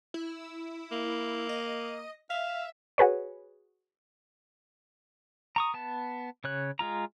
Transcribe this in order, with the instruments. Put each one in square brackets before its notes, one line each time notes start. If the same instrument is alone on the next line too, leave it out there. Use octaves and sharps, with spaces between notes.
[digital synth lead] E4
[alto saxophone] A#3
[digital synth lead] D#5
[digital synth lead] E5 [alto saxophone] F5
[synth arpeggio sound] F#4 G#4 B4 C#5
[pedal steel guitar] A#5 C#6 D#6
B3 A5
C#3 C#5 F#6
G#3 F4 A#5